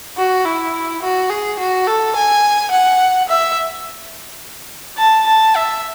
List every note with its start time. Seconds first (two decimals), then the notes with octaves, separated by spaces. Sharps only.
0.17 F#4
0.45 E4
1.02 F#4
1.30 G#4
1.59 F#4
1.87 A4
2.16 G#5
2.71 F#5
3.29 E5
4.98 A5
5.27 A5
5.56 E5